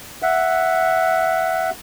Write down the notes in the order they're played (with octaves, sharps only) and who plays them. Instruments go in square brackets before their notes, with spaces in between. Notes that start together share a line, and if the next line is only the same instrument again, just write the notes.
[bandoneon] E5 F#5